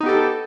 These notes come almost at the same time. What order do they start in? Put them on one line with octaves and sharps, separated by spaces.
D#4 B3 G4 A4